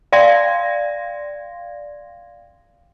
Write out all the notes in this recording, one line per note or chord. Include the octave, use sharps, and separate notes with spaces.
D5 F5 G5 C6 G#6 A#6